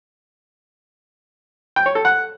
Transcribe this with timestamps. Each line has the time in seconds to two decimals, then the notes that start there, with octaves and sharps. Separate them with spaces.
1.76 G5
1.86 C#5
1.95 A4
2.05 F#5